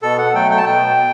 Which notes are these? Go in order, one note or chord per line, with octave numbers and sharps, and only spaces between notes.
B2 A4
F#5
F#3 A3 G5
G5
A5
B2 G5